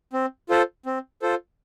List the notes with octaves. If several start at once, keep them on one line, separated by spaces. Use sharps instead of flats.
C4
F4 A4 C5
C4
F4 A4 C5